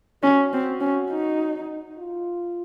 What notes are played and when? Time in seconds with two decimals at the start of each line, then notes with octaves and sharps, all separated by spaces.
0.23 C#4 F#4
0.53 C4
0.81 C#4
1.11 D#4
1.98 F4